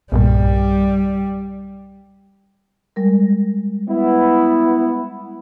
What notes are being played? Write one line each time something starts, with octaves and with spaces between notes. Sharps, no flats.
B1 G2 A#2 G3
G3 G#3 A#4
B3 E4